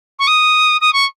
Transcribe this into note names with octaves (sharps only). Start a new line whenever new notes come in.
C#6
D#6
D#6
C#6